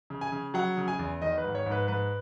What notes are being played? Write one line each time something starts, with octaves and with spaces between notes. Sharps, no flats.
C#3
G#5
C#3
F#3 F#5
C#3
G#5
E2
D#3 D#5
B4
G#2
C#5
G#2
B4
G#2 B4